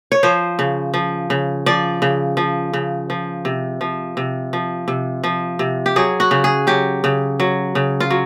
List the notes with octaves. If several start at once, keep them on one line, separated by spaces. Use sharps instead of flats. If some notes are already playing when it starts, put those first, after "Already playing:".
C#5
F3 C5
C#3
F3
C#3
F3 D5
C#3
F3
C#3
F3
C3
F3
C3
F3
C3
F3
C3
G4
F#3 G#4
F#4
C#3
G#4
F#3 G4
C#3
F#3
C#3
F4
F#3